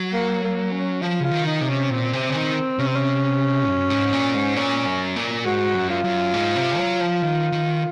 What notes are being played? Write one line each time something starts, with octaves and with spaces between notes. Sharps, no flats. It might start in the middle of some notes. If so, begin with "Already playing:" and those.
Already playing: F#3
A#3
A#3
C#4
F3 F4
C#3 F4
D#3
D#4
C3
C#4
A#2 C4
C3
C#3
D#3
C3 C#4
C4
C#4
F#2
G#2
A#2
G#2
A#2 C#4
F#2
A#2
G#2 F#4
F#2
F4
F#2
G#2
C3
F#3
F3
D#3
D#3